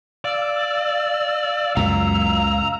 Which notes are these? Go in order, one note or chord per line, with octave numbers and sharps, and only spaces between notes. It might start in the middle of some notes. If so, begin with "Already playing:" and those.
D5 F5 E6
C#2 F#2 A#2 A#5